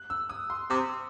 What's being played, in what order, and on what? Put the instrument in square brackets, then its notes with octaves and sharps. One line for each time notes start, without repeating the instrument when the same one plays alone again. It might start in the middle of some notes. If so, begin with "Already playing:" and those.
Already playing: [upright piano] F#6
E6
D#6
C6
[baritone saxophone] C3 [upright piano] D#6